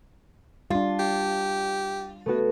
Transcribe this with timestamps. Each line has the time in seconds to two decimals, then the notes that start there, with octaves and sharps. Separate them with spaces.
0.70 G3 D4 F4
1.00 G4
2.26 A3 B3 F#4